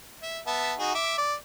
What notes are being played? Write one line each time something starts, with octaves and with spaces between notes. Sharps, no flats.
E5
B3 E5 A5
D#4 F#4 G#4
E5 D6
D5